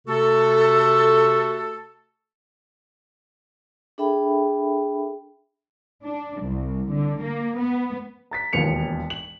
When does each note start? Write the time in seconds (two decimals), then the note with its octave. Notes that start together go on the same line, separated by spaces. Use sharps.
0.07 C3 A3 F#4 A4
3.98 D4 G#4 A4 E5 G5 B5
6.03 D4
6.42 C2
6.91 D3
7.21 A#3
7.57 B3
8.31 A#5 A6 B6
8.53 E1 D#2 F3 B3 C#7 F7
9.10 F#7